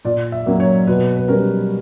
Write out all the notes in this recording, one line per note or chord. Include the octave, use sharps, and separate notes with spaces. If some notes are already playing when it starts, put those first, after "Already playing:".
A#2 D5
E5
F#3 A#3 C#4
C#5
B2 B4
B4
G3 C#4 A#4